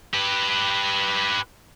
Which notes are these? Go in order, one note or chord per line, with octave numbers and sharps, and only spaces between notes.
G4 B4